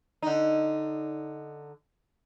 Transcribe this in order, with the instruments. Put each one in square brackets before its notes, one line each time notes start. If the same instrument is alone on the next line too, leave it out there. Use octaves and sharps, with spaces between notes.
[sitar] D3 D#4